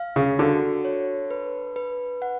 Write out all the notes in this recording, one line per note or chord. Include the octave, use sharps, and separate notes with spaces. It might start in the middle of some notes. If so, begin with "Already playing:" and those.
Already playing: F5
C#3
D3 F#4
C#5
B4
B4
F#5